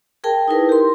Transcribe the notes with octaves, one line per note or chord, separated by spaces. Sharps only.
G#4 A#4 G5 A5
D#4 E4 A#4 B4
G4 C6